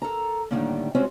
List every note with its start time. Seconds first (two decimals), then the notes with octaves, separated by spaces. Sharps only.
0.02 A4 A#4 A#5
0.51 A2 D3 D#3 G3 A#3
0.95 G3 G#3 C4 C#4 F4 F#4